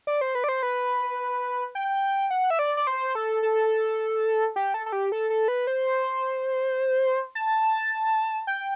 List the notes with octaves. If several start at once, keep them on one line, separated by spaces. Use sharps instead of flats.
D5
C5
B4
D5
C5
B4
G5
F#5
E5
D5
D5
C5
A4
A4
G4
A4
A4
G4
A4
A4
B4
C5
A5
G5